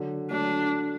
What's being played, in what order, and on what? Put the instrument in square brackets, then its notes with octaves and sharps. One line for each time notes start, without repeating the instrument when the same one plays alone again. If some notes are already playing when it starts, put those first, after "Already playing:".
Already playing: [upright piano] D3 F#3
[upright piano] F#3 A3 [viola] D4